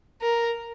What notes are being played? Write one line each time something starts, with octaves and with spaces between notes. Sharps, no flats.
A#4